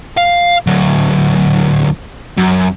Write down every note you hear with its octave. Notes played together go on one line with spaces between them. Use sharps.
F5
D2 F#3
F#2